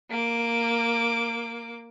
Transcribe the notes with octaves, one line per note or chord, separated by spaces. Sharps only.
A#3 D6